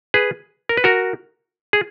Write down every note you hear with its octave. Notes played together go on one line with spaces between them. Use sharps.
G#4 B4
A#4
B4
F#4 A#4
G#4